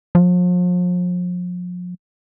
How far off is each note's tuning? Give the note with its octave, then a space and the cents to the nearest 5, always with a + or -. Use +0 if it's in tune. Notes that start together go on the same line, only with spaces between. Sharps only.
F3 +40